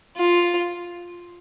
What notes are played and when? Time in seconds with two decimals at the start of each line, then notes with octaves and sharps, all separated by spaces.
0.17 F4